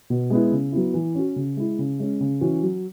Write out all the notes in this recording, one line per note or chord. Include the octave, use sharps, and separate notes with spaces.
B2
G#3 B3 E4
C#3
F#3 B3 E4
E3
C#4 F#4
C#3
G#3 E4
C#3
G#3 C#4
C#3
E3 C#4 F#4
F#3